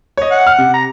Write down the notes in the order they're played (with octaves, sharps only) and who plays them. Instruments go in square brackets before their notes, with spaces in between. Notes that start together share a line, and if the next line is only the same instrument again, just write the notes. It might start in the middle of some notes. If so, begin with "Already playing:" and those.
[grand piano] C#5 D#5
[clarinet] F#5
[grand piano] F6
C3
[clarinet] A#5